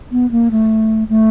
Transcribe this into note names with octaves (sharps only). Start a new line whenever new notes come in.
B3
A#3
A3
A3